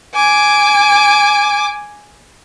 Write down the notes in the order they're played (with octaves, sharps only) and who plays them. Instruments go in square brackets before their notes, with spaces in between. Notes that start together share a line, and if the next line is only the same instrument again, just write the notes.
[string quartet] G#5 D6